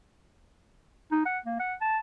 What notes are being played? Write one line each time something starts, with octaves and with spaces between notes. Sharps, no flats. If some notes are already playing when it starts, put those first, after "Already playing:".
D#4
F#5
A#3
F#5
A5